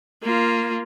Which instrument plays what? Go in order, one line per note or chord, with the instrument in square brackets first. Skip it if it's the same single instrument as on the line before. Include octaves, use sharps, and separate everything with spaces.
[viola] A#3 F4